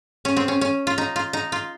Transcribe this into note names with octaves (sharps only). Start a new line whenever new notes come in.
C#4
C4
C#4
C#4
F4
D#4
F4
D#4
F4